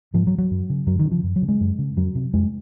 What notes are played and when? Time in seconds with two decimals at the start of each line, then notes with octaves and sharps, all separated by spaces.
0.14 G#2 F3
0.27 F#3
0.38 F#3
0.51 F#2
0.70 C#3
0.87 F#2 F#3
0.99 D#3
1.05 C#3
1.11 F3
1.23 F#2
1.36 F#3
1.42 C#3
1.48 G#3
1.60 F#2
1.79 C#3
1.97 F2 F#3
2.15 C3
2.34 F2 G#3